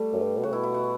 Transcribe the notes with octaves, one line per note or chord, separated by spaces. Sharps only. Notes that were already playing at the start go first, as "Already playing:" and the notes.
Already playing: G3 A3
F#2
G2
B2
C#3 F#4
B2 E4
E4
F#4